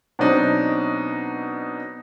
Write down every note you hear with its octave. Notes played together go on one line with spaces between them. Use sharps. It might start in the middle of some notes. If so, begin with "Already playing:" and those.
B2 F#3 C4 D4 D#4